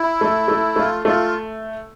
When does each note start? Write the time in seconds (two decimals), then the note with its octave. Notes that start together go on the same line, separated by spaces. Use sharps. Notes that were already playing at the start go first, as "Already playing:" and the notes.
Already playing: E4
0.21 A3
0.48 A3
0.76 A3 F4
1.04 A3 F4